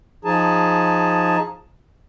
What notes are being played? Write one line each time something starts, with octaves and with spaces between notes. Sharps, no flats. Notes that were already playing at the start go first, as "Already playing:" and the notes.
F3 D#4 G#4 A5